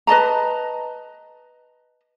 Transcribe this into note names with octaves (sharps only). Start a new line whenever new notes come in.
B4 D#5 A5 A#5